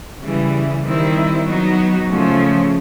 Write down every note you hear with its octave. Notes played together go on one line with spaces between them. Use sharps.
C#3 E3 G3
D#3 G3 C4 E4
F#3 B3 D#4 F#4
C#3 F3 A3 C#4